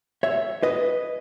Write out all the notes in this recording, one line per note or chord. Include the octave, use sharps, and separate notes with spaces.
C#5 E5
B4 D#5